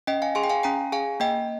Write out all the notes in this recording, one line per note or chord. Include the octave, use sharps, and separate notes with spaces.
C#4 D#5 G5
F5 G#5
G#4 G#5 C6
G5
F5 G#5
C#4 G5 A#5
G#4 F5 G#5
A#3 D#5 G5